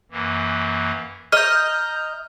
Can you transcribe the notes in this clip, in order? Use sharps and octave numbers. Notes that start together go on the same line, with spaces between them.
F#2 E3 A#3
D#5 A#5 F6 G6